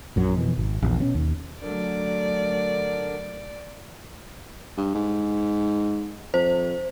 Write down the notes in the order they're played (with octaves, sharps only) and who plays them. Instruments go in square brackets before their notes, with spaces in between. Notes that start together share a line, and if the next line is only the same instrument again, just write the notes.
[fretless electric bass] A#1 F#2 F#3
F2 B2 E3
G#1
A#1 E2 A#2
B2 F3 C#4
D#2
[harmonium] D3 D4 A#4 [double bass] F#3 A3 [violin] D5
[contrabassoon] G2
G#2
[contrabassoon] F2 [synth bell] C5